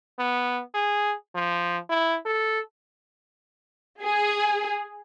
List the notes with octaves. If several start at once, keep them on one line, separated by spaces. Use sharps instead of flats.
B3
G#4
F3
E4
A4
G#4